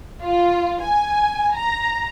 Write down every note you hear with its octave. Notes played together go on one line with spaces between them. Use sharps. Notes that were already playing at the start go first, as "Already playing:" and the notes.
F4
G#5
A#5